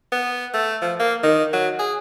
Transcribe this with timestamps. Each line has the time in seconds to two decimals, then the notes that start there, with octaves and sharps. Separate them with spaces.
0.12 B3
0.54 A3
0.82 F3
1.00 A#3
1.23 D#3
1.53 F#3
1.79 G#4